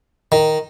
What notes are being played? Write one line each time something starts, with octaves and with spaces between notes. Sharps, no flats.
D#3